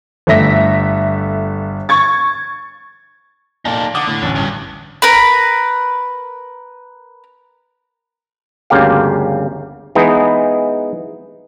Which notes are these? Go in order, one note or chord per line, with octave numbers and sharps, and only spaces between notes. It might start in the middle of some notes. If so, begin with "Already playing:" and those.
G1 A3 E5 A#6 B6
C#6 G#6 A6
A#2 D#4 A4
D3 F#5 D6 D#6
A2
A1 D2
G2
A#4 B4 B5
G1 D2 C#3 A#3 G4 F5
E3 G#3 B3 D#4